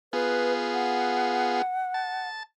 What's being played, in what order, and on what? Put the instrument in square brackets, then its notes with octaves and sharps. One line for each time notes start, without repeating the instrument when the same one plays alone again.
[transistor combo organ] B3 F4 G#4 [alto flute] B4
[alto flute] F#5
[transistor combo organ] A5